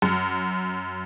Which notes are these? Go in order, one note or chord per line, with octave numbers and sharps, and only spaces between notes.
F#2